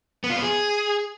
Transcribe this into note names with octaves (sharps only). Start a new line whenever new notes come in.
B3
F4
B3
G#4